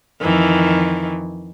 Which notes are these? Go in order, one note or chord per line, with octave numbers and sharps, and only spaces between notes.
F2 D#3 E3